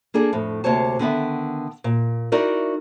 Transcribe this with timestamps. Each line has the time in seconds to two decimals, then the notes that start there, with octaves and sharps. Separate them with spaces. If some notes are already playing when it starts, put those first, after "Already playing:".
0.14 A#3 D4 G#4 A4
0.33 F2 A2
0.64 D2 C3 A#3 C5 C#5 A5
0.99 D3 D#3 B3 E5
1.84 A#2
2.32 D#4 E4 F#4 A#4 D5